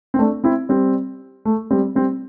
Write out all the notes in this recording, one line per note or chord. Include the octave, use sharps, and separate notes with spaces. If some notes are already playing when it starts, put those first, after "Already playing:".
C4
A3 D4
C4 E4
G3 C4
A3
G3 C4
G3 C4